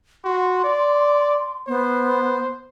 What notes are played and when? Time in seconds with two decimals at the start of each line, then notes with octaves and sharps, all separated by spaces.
0.25 F#4 C6
0.64 D5
1.68 B3 C5